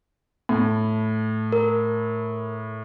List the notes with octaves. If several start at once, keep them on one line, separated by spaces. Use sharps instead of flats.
A2
A#4